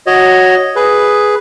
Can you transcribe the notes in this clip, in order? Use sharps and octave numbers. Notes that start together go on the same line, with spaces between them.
F#4 C#5 D#5
G#4 B4